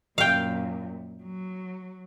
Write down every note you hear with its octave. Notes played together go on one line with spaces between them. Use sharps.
F#2 A#2 F5 G5
F#3